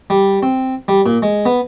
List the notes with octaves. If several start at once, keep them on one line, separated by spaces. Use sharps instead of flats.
G3
C4
G3
A#2
G#3
B3